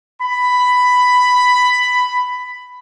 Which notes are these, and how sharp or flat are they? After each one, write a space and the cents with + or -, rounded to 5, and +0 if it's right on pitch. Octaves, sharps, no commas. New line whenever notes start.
B5 +10